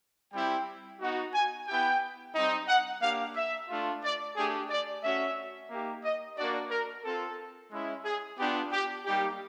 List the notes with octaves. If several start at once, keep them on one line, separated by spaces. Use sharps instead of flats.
G3 C4 E4 G4 G5
B3 D#4 F#4
G#5
B3 E4 G4 G5
G3 C4 D#4
F#5
A#3 D4 G4 F5
E5
A3 D4 F4
D5
A3 D4 G4 G#4
D5
A3 C#4 F#4 E5
A#3 D#4 G4
D#5
A#3 D4 F#4 D5
A#4
C4 F4 A4
G#3 C#4 E4
G#4
B3 D4 F4 G4
G4
G3 A#3 D#4 G4